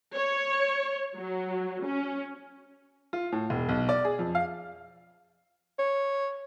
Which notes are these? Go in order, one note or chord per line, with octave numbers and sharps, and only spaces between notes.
C#5
F#3
C#4
F4
A2
E1
B1
D5
G#4
F2
F5
C#5